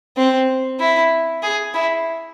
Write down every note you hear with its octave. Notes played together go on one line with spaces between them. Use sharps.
C4
E4
G#4
E4